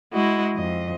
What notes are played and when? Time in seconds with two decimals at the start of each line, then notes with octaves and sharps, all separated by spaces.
0.13 G#3 E4 F#4 D#5
0.56 F2 D#5